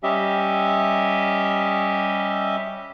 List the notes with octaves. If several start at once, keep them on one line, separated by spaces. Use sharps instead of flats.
G3 C#4 G4 D#5 E5